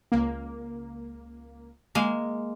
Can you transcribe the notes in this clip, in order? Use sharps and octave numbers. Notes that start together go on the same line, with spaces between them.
C#2 A#3
G#3 A#3